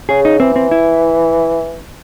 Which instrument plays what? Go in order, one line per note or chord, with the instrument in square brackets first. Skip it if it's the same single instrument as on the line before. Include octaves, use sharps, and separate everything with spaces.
[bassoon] C#3 [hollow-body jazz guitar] G#4
[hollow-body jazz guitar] D#4
[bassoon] E3 [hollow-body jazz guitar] C4
[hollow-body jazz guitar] C4
E4